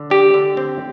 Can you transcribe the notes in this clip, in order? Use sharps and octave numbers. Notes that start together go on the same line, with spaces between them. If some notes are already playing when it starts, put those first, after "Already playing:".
Already playing: D3
D4 G4
D3
C4